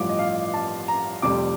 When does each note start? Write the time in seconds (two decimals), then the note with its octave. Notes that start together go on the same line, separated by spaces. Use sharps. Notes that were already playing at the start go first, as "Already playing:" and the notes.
Already playing: A1 G2 F3 D6
0.09 D#5
0.19 F5
0.54 A5
0.88 A#5
1.22 F1 F2 C3 G3 D6